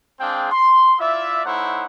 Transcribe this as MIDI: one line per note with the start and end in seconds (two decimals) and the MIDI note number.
0.20 0.49 56
0.20 0.49 60
0.20 0.49 62
0.20 0.49 68
0.20 0.49 77
0.20 0.49 79
0.51 0.93 84
1.00 1.44 64
1.00 1.44 65
1.00 1.44 74
1.00 1.44 76
1.45 1.85 57
1.45 1.85 63
1.45 1.85 64
1.45 1.85 72
1.45 1.85 73
1.45 1.85 78